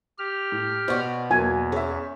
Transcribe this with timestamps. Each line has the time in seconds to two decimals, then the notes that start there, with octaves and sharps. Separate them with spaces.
0.19 G4 F6
0.52 A2
0.88 B2 C5 D5 F#5 C#6
1.31 E2 F#3 A#3 B3 G#5
1.72 C#4 G#4 E5